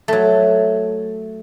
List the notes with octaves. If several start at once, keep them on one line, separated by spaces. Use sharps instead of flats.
F#3 A3